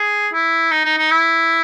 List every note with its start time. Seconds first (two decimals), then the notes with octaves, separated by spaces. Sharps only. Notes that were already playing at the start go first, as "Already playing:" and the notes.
Already playing: G#4
0.33 E4
0.71 D#4
0.85 D#4
0.98 D#4
1.11 E4